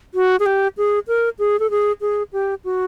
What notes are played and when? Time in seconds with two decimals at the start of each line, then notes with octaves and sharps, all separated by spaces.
0.14 F#4
0.40 G#4
0.46 G4
0.77 G#4
1.08 A#4
1.39 G#4
1.60 A4
1.71 G#4
2.01 G#4
2.33 G4
2.65 F#4